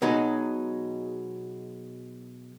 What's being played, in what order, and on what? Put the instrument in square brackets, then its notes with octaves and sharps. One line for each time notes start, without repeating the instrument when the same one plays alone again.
[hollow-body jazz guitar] B2 F#3 G#3 D#4